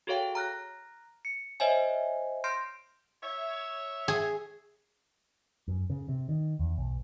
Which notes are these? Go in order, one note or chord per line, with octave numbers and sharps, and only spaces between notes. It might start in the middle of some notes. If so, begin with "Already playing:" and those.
F#4 G#4 A4 C#5 F5 G5
A#5 F6 F#6 A#6
C#7
C5 C#5 D#5 E5 G#5
C6 F6 G6 A#6 C7 D7
C#5 E5
G#4
F#2
C#3
C3
D#3
E2
B1